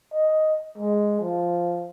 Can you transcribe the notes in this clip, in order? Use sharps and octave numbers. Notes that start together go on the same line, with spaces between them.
D#5
G#3
F3